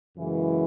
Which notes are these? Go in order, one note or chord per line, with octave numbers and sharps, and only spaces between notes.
F#2 C#3 E3 G#3